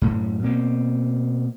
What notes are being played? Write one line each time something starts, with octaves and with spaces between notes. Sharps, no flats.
F#2 A2
B2 A#3 C4